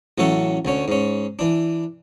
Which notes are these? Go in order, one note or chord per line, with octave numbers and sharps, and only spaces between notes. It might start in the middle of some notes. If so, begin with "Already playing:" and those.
A1 F#3 A3 C#4 A4 F#5
D2 D3 C#4
G#2 C#4
E3 D4